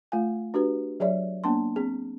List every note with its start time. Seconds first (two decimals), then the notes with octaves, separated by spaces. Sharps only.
0.12 A3 F4 F5 G#5
0.54 D4 F#4 G4 B4
1.00 F#3 G#4 C#5 D5 E5
1.44 A#3 B3 D4 A5 C6
1.76 C4 G#4